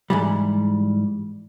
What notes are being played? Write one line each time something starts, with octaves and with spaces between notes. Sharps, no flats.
G#2 E3 G3